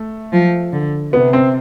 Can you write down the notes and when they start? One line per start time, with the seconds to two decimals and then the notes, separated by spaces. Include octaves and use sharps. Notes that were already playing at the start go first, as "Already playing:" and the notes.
Already playing: A3
0.32 F3
0.73 D3
1.13 C3 B3
1.33 C4